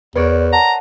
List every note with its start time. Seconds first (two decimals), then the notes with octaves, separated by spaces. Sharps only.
0.16 E2 A#4 B4 C#5 D5
0.53 F#5 A5 A#5